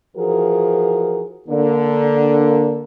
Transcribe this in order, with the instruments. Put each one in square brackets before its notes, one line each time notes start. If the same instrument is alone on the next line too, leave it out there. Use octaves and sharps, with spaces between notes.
[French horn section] E3 F3 F#4 G#4 A#4
D3 A#3 D4